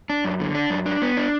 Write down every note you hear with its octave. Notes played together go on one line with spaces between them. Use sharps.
D4
F#2
D3
D4
F#2
D4
B3
D4